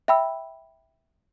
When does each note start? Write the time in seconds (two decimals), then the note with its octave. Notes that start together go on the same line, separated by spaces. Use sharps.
0.08 E5 G5 B5 E6